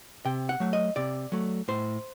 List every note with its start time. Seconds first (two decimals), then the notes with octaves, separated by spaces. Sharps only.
0.25 C3 G5
0.49 F#5
0.60 F#3 A3
0.73 D#5
0.96 C3 D5
1.32 F#3 A3
1.68 A2 C5